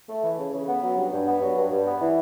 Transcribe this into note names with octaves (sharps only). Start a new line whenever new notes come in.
A3
E3
C#3
C#3
B3
F#3
G2
G2
B3
F#3
G2
G2
B3
E3